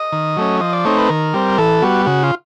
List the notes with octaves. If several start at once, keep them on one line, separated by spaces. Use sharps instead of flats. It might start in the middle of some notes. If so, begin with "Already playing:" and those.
Already playing: D#5
D#3
F#3 A3 C#4
F3 D#5
D5
A3 C4 D#4 C#5
B4
D#3 A#4
G3 C4
E3 A4
G3 B3 F#4
C#3 F#4
F4